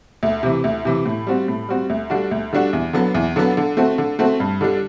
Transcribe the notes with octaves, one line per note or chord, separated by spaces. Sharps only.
D2
C3 E3
D2
C3 E3
A2
G3 C4 F#4
A2
G3 C4 F#4
D2
D3 G3 D4 F#4
D2
D3 G3 D4 F#4
E2
D3 F#3 B3
E2
D3 F#3 B3
D3
A3 C4 F#4
D3
A3 C4 F#4
G2
D3 G3 D4